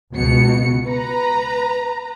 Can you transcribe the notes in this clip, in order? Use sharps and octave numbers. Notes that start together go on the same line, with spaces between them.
C#2 B2 C#7
B4 A#5